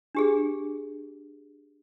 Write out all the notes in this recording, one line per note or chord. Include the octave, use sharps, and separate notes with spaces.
D4 G4 G#4